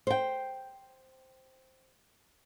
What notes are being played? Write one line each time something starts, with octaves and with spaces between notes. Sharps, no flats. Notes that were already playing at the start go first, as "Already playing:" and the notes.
C5 G5